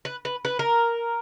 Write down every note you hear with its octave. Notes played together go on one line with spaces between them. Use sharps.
B4
B4
B4
A#4